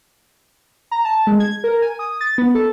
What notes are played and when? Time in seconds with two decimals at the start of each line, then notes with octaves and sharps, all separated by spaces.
0.91 A#5
1.05 A5
1.27 G#3
1.40 G#6
1.64 A#4
1.82 G#5
1.99 D#6
2.21 A6
2.38 B3
2.55 A4